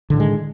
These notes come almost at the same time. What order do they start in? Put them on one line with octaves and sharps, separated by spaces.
D3 A2 D#3 G#3